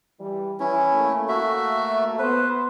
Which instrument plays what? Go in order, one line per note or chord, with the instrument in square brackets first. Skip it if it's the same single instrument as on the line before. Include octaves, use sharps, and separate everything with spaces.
[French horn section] E3 G3
[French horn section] E3 [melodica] C#4 E4
[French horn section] A3 A#3
[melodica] F#4 E5
[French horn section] B3 C5 [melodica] B4